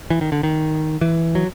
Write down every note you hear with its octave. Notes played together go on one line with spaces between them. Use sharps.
E3
D#3
D3
D#3
E3
F#3